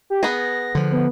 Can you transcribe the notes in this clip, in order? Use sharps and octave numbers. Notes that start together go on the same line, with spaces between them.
G4
B3 G#4 A#6
D3 F3
B3